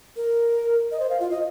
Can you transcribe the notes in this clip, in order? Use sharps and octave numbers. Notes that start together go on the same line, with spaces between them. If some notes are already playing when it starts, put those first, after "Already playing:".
A#4
D#5
C5
F5
F4
D#5